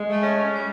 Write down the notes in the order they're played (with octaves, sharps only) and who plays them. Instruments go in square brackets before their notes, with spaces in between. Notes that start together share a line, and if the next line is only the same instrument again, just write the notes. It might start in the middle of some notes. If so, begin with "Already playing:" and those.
Already playing: [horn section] G#3
[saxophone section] A3
C#4
C#4
G3